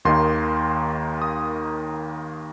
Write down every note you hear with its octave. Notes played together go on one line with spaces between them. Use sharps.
D#2 D#3 A#3 D#4 C6
D#6